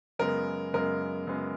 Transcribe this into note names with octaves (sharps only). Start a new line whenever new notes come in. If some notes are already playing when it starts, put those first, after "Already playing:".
F#2 C#3 G#3 B3 A#4
F#2 C#3 G#3 B3 A#4
F#2 C#3 G#3 B3